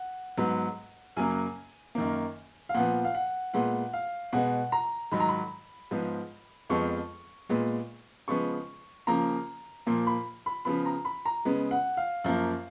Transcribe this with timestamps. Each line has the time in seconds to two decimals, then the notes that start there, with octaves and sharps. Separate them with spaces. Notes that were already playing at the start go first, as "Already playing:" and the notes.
Already playing: F#5
0.37 G#2 F#3 B3
1.16 F#2 C#3 F#3 A#3 G#5
1.95 F#2 D#3 A#3
2.69 F5
2.74 A#2 F3 B3 F#5
3.05 F5
3.15 F#5
3.54 A#2 G#3 B3 F#5
3.93 F5
4.33 B2 G#3 B3 F#5
4.72 A#5
5.12 G#2 D#3 F#3 B5
5.20 A#5
5.29 B5
5.91 G#2 F3 B3
6.70 F2 F3 G#3 B3 C#6
7.49 A#2 G#3 B3
8.28 C#3 F3 G#3 B3 C#6
9.07 C#3 F3 A#3 A#5
9.87 A#2 F3 A#3
10.07 B5
10.46 B5
10.65 C#3 F3 B3 B5
10.86 A#5
11.05 B5
11.26 A#5
11.45 C#3 G#3 B3
11.71 F#5
11.97 F5
12.24 F#2 F3 A#3